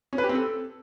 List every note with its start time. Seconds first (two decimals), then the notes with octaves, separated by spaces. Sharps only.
0.13 C#4
0.18 B4
0.24 G4
0.29 C4
0.35 A4